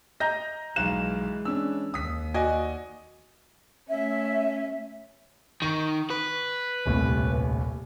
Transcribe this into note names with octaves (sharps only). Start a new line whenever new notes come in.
D#5 A#5 G6 A#6
B1 E3 G#3 F5 F#6 E7
C#4 D4 E6
D#2 D#6 B6
F#4 D5 D#5 G#5
A3 C#4 E5
D#3 C#6
B4
D#1 C2 A2